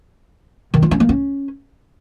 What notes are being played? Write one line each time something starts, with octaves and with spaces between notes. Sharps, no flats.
D#3
F4
C#4
A#3
C#4